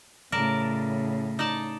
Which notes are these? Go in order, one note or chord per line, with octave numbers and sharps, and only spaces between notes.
A2 C#3 A#4 D5 A5
D#4 D5 A5